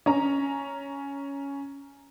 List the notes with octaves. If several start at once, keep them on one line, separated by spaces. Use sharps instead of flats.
C#4 A#5